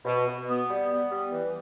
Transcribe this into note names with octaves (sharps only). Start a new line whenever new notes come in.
B2
B2
B3
G3
B3
G3
E3